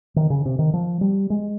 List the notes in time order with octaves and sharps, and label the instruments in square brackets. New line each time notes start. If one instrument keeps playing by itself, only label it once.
[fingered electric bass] D#3
C#3
C3
D#3
F3
G3
G#3